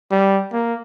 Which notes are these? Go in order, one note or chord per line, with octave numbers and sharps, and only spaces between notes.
G3
A#3